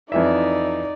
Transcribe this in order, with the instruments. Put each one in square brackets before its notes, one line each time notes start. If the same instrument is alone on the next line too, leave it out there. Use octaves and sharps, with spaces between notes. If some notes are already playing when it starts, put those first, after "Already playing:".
[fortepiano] F2 E3 E5 [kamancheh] D#4 D5